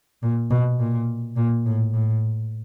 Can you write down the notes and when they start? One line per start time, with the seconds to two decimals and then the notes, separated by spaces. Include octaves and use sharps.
0.22 A#2
0.51 B2
0.79 A#2
1.36 A#2
1.66 A2
1.94 A2